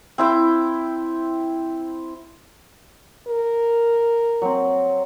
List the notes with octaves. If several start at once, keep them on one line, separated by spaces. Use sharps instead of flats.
C4 E4 G5
A#4
F#3 C4